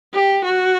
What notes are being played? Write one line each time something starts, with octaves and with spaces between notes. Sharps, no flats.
G4
F#4